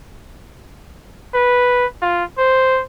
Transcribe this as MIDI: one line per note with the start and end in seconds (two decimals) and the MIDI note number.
1.34 1.86 71
2.02 2.24 65
2.38 2.82 72